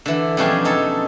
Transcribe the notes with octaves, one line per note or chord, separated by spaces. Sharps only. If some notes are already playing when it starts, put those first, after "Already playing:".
D3 E3
F2 B2 G3 C#4 D4 G#4
F#3 D#4 A4